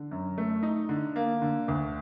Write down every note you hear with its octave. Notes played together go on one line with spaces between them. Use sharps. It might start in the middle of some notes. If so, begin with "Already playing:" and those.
Already playing: D3
F#2
A3
D#4
D3
A#3
D3
D2